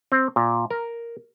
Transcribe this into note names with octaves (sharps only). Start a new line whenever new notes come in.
C4
A#2
A#4